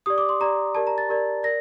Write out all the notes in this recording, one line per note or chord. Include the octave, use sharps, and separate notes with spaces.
G4 D5 D#6
D6
C6
G4 D5 A#5
G4 A#4 D5 A5
A#5
A6
G4 A#4 D5
A#4 D5 A#6